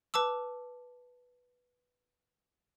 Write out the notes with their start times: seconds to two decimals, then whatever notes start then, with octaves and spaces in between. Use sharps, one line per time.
0.14 B4 A5 D6 E6